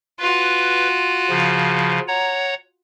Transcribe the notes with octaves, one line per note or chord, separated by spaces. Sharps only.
F4 F#4 B4
C#3 F3
C#5 F#5 A#5